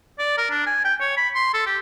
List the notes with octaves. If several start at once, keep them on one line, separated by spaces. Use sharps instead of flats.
D5
A#4
D4
G#5
G5
C#5
B5
C6
A4
G4